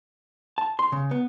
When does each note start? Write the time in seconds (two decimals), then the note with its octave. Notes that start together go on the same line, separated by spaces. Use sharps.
0.58 A5
0.79 C6
0.92 C#3
1.11 B3